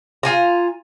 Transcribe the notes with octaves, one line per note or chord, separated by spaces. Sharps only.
F4 G#5 A#5